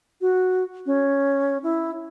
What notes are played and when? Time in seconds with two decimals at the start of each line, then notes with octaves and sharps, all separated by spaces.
0.21 F#4
0.86 C#4
1.63 E4